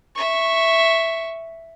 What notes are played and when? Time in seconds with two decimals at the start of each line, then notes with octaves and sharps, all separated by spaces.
0.15 E5 C#6